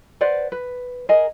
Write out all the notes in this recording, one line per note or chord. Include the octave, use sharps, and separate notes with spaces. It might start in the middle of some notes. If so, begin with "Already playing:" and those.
B4 C5 D5 F#5
B4
G#4 A#4 D#5 G#5